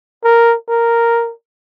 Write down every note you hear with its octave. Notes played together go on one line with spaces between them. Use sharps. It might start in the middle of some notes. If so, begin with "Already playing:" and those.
A#4
A#4